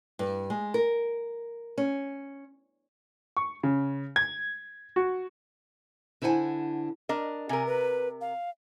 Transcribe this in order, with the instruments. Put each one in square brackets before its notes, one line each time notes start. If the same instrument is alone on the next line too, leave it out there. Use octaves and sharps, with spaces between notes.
[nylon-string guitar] G2
G#3
A#4
C#4
[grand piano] C#6
C#3
G#6
F#4
[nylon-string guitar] D3 E4 C5 F#5 G#5
[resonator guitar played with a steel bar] D4 A#4 D#5
[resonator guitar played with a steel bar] C3 A#4 [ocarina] G#5
[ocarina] B4
F5